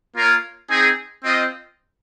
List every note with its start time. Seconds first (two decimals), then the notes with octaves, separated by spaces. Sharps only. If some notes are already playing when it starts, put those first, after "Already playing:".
0.15 A#3 F4 A#4 C#5
0.70 C4 D#4 G#4
1.24 C4 F4 C5 D#5